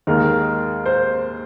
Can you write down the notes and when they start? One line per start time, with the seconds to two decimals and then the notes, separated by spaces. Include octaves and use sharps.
0.07 D#2 D#3 G#3 A#4
0.86 C5